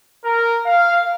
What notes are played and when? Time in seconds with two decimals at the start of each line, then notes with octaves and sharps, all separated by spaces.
0.24 A#4
0.66 F5